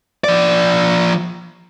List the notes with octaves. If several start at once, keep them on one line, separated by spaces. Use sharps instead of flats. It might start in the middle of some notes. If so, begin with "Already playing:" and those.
F3 D5